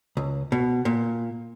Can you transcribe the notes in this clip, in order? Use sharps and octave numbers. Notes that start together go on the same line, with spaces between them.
C#2
B2
A#2